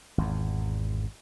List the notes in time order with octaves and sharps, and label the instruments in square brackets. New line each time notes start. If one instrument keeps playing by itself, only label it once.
[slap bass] G#1 E2